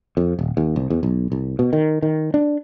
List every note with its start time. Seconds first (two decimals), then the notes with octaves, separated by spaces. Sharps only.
0.17 F2
0.39 D#1
0.57 D#2
0.76 C2
0.90 E2
1.03 B1
1.32 C2
1.59 B2
1.73 D#3
2.02 D#3
2.34 D4